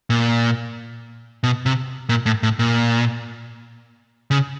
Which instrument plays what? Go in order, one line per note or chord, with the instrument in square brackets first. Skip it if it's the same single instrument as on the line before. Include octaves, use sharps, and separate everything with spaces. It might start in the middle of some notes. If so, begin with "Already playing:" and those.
[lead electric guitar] A#2
B2
C3
A#2
A2
A2
A#2
C#3